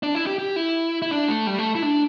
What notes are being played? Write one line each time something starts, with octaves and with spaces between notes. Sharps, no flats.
D4
E4
G4
G4
E4
E4
D4
A3
G3
A3
E4
D4